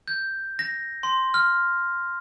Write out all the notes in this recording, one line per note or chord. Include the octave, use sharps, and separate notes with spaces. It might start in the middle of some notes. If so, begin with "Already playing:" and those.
G6
A#6
C6
F6